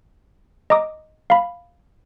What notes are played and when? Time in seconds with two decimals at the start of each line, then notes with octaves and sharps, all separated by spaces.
0.70 D#5 A#5 D6 D#6
1.30 F5 B5